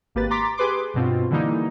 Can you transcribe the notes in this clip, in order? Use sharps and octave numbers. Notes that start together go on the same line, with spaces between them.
G#1 A#3 G4 B4 A6
A#5 C6 D6 A6 B6
G4 G#4 B4 C6 D6
G2 B2 C4 F4
D3 E3 G3 A#3 D#4 E4